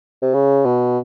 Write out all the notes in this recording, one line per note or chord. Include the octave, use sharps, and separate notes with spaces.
C3
C#3
B2